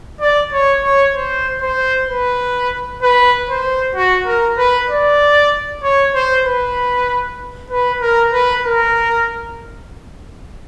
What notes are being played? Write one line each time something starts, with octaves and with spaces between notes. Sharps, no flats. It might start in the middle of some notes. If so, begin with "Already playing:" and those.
D5
C#5
C#5
C5
C5
B4
B4
C5
F#4
A#4
B4
D5
C#5
C5
B4
B4
A#4
B4
A#4